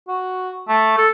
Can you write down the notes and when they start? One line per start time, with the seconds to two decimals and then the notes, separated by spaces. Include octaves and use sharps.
0.08 F#4
0.68 A3
0.98 A4